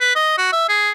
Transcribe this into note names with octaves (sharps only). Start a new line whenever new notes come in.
B4
D#5
F#4
E5
G#4